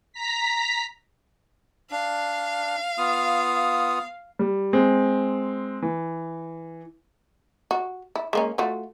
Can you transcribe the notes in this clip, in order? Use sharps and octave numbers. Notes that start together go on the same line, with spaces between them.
A#5 B6
D4 F5
B3 F4 D#6
G3
G#3 C4
E3
F#4
E4
G#3 A#3 C#4
A3 F4 F#4